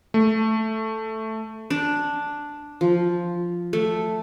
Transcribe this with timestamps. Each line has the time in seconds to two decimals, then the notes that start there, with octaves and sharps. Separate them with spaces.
0.14 A3
1.70 D4
2.81 F3
3.73 A3